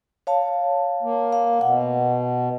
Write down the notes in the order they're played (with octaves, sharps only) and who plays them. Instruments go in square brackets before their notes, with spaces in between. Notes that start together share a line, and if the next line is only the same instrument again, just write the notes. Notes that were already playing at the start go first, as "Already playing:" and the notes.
[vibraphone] C#5 F5 A5
[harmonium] A#3
[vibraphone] F5
[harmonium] B2 [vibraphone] F#5